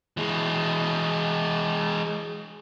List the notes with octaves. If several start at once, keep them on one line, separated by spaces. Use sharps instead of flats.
E3 G#3